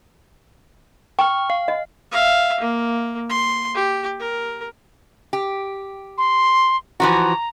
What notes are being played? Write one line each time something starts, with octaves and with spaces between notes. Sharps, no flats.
G5 C#6 F6
F5
D#5
E5 F5
A#3
C6
G4
A#4
G4
C6
E3 F3 F#4 A#5